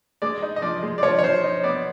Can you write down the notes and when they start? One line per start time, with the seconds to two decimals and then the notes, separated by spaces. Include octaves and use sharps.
0.22 G#3 D5
0.42 D#4
0.56 D#5
0.62 F3 D5
0.83 G#3
0.98 D5
1.03 F3 C#5
1.19 C#5
1.23 F3 C5
1.44 D#4
1.64 B3 D5